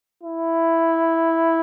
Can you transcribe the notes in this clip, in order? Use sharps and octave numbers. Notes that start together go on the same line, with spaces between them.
E4